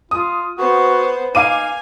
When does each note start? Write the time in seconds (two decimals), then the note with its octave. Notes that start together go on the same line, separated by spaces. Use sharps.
0.11 F4 D#6
0.58 B3 F#4 C5
1.35 D#4 F5 G#5 D6 D#7